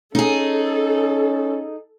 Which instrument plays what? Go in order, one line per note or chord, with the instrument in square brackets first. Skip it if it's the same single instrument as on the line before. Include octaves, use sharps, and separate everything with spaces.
[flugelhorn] C#4 [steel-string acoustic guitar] D#4 G#4 [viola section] A4